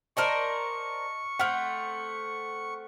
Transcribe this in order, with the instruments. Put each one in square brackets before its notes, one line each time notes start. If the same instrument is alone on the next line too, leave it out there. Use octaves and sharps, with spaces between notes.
[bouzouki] A#4 C5 D5 [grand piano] D#5 A5 F6 [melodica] C#6
[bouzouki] A3 C4 [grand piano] F#5 F6